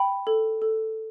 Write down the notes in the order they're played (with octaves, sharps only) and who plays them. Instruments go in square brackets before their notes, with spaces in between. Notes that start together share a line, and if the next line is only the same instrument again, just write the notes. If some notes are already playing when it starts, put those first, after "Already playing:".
Already playing: [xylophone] G5 B5
A4
A4